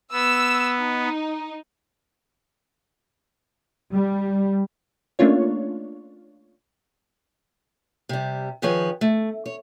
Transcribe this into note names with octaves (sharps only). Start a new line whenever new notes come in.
B3 E6
D#4
G3
A3 A#3 C#4 D4 F4 C#5
C3 G3
D#3 F3 G#4 B4 C#5
A3
C#5